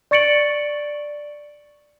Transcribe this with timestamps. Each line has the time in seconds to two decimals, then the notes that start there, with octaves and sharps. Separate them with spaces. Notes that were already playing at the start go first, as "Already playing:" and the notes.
0.11 D5 C#6 A6 C#7 D7 F#7